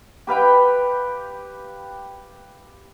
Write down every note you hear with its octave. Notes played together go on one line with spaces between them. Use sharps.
G4 B4 F5 G5